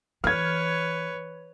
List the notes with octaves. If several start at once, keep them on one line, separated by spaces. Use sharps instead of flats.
E3 B4 C#5 F6 G#6